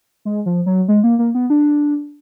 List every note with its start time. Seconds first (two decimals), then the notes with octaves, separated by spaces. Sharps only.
0.25 G#3
0.46 F3
0.66 F#3
0.88 G#3
1.04 A#3
1.19 A#3
1.35 B3
1.50 D4